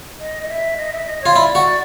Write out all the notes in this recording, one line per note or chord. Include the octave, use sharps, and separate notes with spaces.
D#5
D#5
E5
D#5
E5
D#5
F4 C#5
E4 D5
F#4